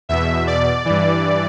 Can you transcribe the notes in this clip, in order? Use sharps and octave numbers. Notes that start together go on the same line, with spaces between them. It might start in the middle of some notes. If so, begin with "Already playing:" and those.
E2 B2 E5
D5
G2 E3